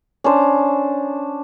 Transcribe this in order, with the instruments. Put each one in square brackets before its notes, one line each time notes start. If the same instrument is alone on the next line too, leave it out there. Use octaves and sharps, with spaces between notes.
[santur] C#4 D4 C5